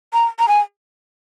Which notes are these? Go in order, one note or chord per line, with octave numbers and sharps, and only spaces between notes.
A#5
A#5
G#5